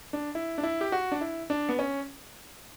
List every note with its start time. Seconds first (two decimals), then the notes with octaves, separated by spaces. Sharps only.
0.13 D4
0.35 E4
0.58 D4
0.63 E4
0.81 G4
0.92 F#4
1.12 D4
1.21 E4
1.50 D4
1.69 B3
1.79 C#4